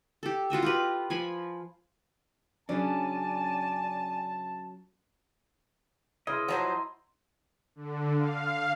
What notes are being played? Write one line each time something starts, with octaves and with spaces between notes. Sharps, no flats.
G4 A4
F4 F#4 D#5 E5
F4 G4 B4
F3 G#5 B5
C#3 F#3 C#4 D4 D5 G#5 A5
C#3 E4 B4 D#5 C6 F6 G#6
F3 F#3 C5 F#5 A5 A#5 C6
D3
F5